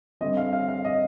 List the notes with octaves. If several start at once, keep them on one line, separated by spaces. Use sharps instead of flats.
D3 G3 C4 D#5
F5
F5
F5
D#5